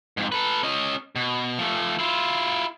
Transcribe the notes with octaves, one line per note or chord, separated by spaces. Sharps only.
F2 G#2
A4 B4
C#4 D#5
B2
F3 A3
E4 F4